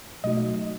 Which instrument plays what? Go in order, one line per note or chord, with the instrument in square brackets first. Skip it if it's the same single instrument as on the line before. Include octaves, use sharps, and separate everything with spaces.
[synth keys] B2 F#3 A3 D#4 F#4 [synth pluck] D#5